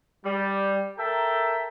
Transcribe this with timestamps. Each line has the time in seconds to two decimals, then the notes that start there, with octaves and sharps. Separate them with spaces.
0.24 G3
0.98 A4 A#4 E5 G5 A5 A#5